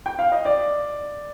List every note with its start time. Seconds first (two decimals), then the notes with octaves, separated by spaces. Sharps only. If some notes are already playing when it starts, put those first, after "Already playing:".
0.06 G5
0.19 F5
0.32 D#5
0.45 D5